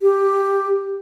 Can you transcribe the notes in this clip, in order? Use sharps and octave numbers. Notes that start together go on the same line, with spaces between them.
G4